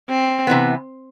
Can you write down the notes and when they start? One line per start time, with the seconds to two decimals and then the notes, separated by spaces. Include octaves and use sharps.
0.09 C4
0.47 C3 E3 B3